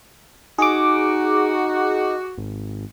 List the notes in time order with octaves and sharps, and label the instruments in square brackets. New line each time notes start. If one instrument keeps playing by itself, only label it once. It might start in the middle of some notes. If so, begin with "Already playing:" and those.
[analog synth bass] D#4 [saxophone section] F#4 [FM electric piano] G#4 D6
[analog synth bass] G#1